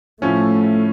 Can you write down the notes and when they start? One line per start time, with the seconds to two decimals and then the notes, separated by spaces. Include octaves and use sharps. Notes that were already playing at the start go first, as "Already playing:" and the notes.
0.22 A2 F3 A3 C#4